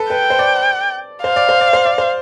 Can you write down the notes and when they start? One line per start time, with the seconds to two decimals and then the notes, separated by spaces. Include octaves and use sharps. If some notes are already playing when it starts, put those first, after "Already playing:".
Already playing: A4 B4
0.10 B4 G5
0.30 C5
0.39 D5
1.23 C5 F5
1.36 D5
1.49 C5
1.61 D5
1.73 C5
1.85 D5
1.98 C5